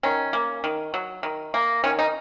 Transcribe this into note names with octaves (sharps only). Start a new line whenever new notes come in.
D#3 C#4
A#3
D#3
F#3
D#3
A#3
D#3 C#4
D#4